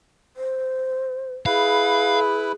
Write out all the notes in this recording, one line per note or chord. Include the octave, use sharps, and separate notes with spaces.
C5
E4 G#4 B4 F5